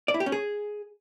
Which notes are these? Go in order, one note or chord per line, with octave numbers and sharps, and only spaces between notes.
D5
E4
G4
C#4
G#4